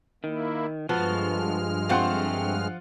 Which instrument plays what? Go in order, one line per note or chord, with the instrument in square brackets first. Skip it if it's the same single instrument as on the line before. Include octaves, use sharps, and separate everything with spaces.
[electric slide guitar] D#3 [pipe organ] A#3 E4
[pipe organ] G2 G#3 F6 [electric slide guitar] F3 [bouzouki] B3 F#4 A4
[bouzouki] A3 C4 [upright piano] F4 F#5 C6